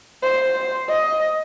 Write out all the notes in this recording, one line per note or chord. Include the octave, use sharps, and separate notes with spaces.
C5
D#5